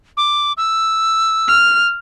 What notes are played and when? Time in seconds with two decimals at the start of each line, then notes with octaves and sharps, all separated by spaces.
0.17 D6
0.57 E6
1.48 F6